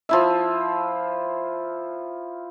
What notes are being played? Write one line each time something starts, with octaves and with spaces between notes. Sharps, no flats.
F3 E4 E5